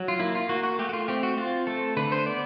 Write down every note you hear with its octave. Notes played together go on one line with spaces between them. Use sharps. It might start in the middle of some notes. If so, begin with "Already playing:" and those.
Already playing: F#3
F4
A#3 E4
F4
A#3 F#4
F#4
A3 G4
F#4
F4
C4 G4
F#4
C4 F4
A3 A4
D3 B4
C5
B3 D5